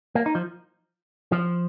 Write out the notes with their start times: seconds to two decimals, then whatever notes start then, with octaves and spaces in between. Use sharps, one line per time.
0.15 A#3
0.26 D#4
0.35 F3
1.32 F3